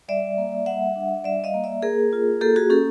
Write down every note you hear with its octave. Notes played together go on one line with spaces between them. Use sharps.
G3 D5 E5
A#3
G3 E5 F#5
D4
G3 D5 E5
D#5 F5
A#3
D5 E5
A#3 G#4 A#4
F4
A#3 G4 A4
F#4 G#4
C#4 G4 A4